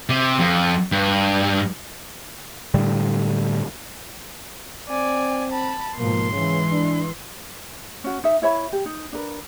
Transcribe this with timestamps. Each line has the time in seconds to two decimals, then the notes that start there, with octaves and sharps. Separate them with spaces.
0.09 C3
0.40 F2
0.92 G2
2.74 A2 D3 G3
4.89 C4 D5 G#5
5.52 A5 B5
5.98 G#2 B2 F3 A#3 C6
6.32 C#3 E3 G#3
6.71 D4
8.04 C#4 F#4
8.24 D#4 E5
8.42 E4 C#5 E5 B5
8.72 G4
8.86 D#4
9.12 D4 A#4 B4